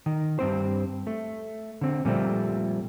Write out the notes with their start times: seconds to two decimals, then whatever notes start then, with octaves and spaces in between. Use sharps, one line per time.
0.06 D#3
0.39 G2 C4 C5
1.07 A3
1.81 D3 C4
2.05 A#2 F3 G3 A3 C4